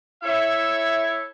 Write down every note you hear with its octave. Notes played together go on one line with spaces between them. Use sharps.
E4 A4 C#5 E5